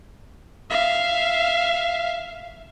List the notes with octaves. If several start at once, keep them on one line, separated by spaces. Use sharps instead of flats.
E5 F5